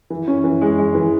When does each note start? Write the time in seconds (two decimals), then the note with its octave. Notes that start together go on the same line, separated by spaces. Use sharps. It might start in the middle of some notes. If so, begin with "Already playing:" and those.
0.10 E3
0.28 C#4
0.44 E3
0.61 G#3
0.79 G#3
0.95 E3